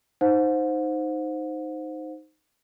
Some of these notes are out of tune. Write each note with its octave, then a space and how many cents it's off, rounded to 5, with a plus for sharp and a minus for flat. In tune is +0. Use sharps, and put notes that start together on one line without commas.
D#4 +0 C5 +0 F#5 -45